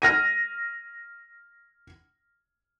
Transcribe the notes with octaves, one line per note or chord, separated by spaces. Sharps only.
F6 A#6 D#7